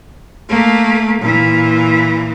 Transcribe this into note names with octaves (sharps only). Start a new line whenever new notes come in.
A3 A#3
A#2 E3